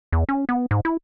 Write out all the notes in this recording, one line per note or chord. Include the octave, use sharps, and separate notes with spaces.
E2
C#4
B3
G#2
E4